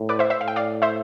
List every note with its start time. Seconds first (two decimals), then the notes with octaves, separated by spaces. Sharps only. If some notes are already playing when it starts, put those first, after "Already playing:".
Already playing: A2
0.09 B4 D5
0.19 C5 E5
0.30 C5 E5
0.40 A2 F5
0.48 G5
0.56 D5 F5
0.82 C5 E5